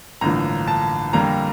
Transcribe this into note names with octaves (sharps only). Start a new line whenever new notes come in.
A1 G2 D3 F3 A#3 A#5
A5
F2 D3 G3 A#3 A#5